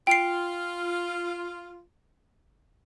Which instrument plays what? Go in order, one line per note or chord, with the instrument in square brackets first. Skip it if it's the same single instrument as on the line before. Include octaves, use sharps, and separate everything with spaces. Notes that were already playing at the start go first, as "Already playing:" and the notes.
[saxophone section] F4 [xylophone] G5 C7